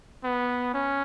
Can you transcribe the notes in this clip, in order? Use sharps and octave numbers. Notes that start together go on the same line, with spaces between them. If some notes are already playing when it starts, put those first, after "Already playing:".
B3
C#4